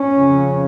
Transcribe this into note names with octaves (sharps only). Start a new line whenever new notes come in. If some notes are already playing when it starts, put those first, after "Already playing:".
Already playing: C#4
F2 C#3